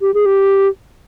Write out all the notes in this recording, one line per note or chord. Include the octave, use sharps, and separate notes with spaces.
G4
G#4
G4